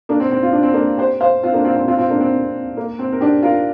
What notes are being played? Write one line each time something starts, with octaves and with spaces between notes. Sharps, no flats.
A#3 D4
C4
C4
F4
D4
C4
A#3 D4
G4 C5
C5 F5
C4 F4
A#3 D4
C4 F4
C4
C4 F4
C4 F4
A#3 D4
C4
A#3
C4
A#4
D4 G4
F4 A#4